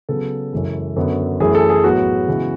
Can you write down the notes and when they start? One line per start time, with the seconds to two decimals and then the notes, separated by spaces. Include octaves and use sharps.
0.09 C#3 F#3 B3 A4
0.52 F#2 C#3 E3 G#3
0.96 F#2 D3 F#3 B3
1.40 F#2 E3 A3 G#4
1.55 A4
1.70 G#4
1.84 A2 F#3 B3 F#4
2.28 C#3 E3 G#3 B3